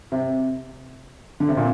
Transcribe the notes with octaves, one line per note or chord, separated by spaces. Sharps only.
C3
D3
C3
A#2